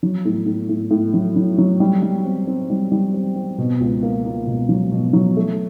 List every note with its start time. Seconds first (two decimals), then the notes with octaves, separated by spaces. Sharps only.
0.03 F#3
0.25 A2
0.46 A2
0.69 A2
0.91 A2
1.14 F#3
1.36 F#3
1.58 F#3
1.80 G3
2.02 G3
2.25 C4
2.47 C4
2.70 G3
2.92 G3
3.14 C4
3.36 C4
3.58 B2
3.80 C#2
4.03 A#3
4.25 A#3
4.47 B2
4.69 F#3
4.91 B2
5.13 F#3
5.37 A3